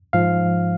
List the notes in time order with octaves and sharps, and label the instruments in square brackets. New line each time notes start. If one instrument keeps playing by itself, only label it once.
[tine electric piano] G#2 F3 F5